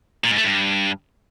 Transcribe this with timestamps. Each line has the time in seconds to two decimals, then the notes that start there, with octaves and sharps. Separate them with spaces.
0.24 A#2
0.31 G#2
0.38 A3
0.44 G2